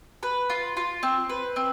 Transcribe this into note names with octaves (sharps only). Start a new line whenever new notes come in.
B4
F4
F4
C4
B4
C4